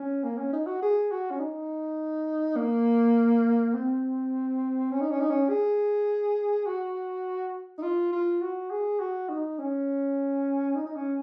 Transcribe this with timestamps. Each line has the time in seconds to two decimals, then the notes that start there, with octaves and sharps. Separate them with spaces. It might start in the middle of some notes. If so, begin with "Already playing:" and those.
Already playing: C#4
0.24 A#3
0.37 C#4
0.53 D#4
0.66 F#4
0.82 G#4
1.11 F#4
1.31 C#4
1.40 D#4
2.57 A#3
3.74 C4
4.91 C#4
5.01 D#4
5.11 C#4
5.20 D#4
5.30 C#4
5.49 G#4
6.66 F#4
7.78 D#4
7.83 F4
8.12 F4
8.42 F#4
8.70 G#4
9.00 F#4
9.29 D#4
9.59 C#4
10.75 D#4
10.86 D#4
10.96 C#4